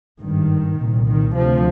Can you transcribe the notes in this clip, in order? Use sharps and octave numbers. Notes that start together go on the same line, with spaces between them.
G#1 G2 D#3
C2 A#2
D#3
D2 C3 F3